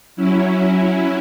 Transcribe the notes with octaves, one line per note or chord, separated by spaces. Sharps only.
F#3 C#4 E4